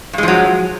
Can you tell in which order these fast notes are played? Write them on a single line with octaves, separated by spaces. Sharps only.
G2 G#3 F3 F#3